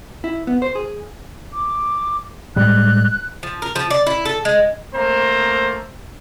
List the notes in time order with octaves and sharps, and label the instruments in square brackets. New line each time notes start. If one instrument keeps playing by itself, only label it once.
[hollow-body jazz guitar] E4
B3
C5
G#4
[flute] D6
[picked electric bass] A2 G3 G#3 [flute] F#6
[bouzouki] F3
A#4
F3
D5
E4
A4
G#3
[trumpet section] A3 A#3 C4 C5 A#5